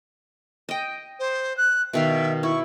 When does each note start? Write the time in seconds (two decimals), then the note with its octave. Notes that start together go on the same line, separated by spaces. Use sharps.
0.69 D#5 G5
1.20 C5
1.58 F#6
1.93 B2 D#3 E5 F5
2.43 E4 C#6